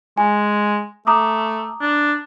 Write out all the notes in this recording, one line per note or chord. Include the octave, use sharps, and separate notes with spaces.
G#3 G#5
A3 A#5 D6 D#6
D4